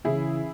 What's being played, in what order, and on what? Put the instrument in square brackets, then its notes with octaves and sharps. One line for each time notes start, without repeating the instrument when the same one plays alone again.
[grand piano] C#3 E3 C#4 [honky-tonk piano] E4 G#4